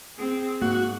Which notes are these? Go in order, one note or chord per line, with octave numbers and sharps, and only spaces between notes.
C4 G#4
G#2 A#3 F#4